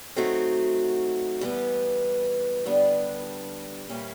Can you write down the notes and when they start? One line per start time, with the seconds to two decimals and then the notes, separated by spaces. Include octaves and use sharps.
0.16 F#3 A3 C4 D#4 F#4
1.41 E3 G3 B3
2.65 G2 D3 G3 B3 D4
3.89 A#2 G3 A#3 C#4 E4